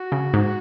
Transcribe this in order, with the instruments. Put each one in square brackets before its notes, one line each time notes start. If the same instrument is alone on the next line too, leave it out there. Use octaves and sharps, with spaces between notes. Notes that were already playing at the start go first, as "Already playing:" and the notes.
Already playing: [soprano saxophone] F#4
[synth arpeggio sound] C#3
G#2